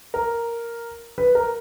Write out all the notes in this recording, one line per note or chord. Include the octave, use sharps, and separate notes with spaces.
A#4
B4
A#4